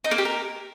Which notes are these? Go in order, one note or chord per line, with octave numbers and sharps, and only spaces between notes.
D#4
A#3
G4
A#4